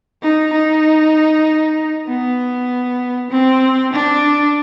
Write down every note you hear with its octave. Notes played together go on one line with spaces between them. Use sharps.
D#4
D#4
B3
C4
D4